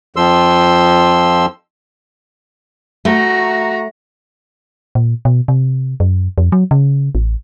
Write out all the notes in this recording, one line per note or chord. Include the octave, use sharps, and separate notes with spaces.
F2 F3 C6 E6
A3 F#4 A#5
A#2
B2
C3
F#2
F2
F#3
C#3
A1